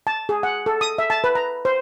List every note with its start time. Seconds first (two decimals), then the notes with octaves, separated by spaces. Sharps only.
0.07 A5
0.29 G#4
0.43 F#5
0.66 A4
0.81 D#6
0.98 E5
1.10 A5
1.24 B4
1.35 A#5
1.65 C5